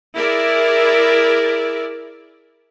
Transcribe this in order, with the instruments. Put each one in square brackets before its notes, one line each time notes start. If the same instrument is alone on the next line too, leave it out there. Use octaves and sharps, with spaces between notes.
[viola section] E4 G#4 A#4 D5